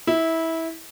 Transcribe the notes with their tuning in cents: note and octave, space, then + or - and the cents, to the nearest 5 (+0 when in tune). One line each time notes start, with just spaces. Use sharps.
E4 -20